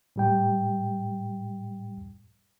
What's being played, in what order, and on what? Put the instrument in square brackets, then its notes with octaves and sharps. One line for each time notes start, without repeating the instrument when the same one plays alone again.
[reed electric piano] A2 G3 G5